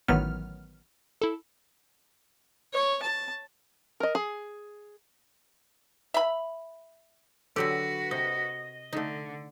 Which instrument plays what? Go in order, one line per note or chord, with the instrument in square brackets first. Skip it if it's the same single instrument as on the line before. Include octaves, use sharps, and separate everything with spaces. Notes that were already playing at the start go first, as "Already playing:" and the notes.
[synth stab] A1 D#3 E3 F#3 B3 F6
E4 A4
[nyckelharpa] C#5
A5
[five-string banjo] A#4 D#5
G#4
[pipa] E5 B5
[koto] D3 F#3 G4 [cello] F#4 B4 [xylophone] A4 E6
[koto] C3 [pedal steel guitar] D#5
[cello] D3 [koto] A3 D#4